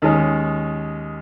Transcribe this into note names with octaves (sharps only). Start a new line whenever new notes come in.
D#2 D#3 G#3 C#4